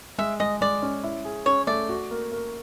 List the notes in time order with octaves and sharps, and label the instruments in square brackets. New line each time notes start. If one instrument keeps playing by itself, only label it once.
[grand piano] G#3 [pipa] E5
[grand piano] G#3 [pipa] D#5
[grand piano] G#3 [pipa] D5
[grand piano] C#4
E4
G#4
[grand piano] C#4 [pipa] C#5
[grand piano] A3 [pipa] D5
[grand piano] F#4
A#3
A#3